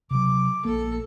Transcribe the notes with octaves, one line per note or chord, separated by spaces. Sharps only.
C3 F#3 D6
A#1 A#3 A4